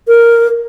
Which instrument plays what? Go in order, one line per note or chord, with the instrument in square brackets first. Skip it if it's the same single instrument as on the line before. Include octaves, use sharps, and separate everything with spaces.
[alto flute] A#4